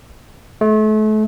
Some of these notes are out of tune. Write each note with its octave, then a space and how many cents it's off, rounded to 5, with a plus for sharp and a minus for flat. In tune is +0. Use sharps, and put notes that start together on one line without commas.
A3 -35